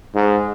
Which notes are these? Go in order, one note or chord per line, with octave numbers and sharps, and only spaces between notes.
G#2